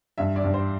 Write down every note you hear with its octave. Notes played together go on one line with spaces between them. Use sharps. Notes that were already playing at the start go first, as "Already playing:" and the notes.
G2 E5
D5
G2
C5